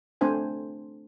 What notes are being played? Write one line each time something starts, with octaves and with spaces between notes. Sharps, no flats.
A3 C4 D4 C5 G#5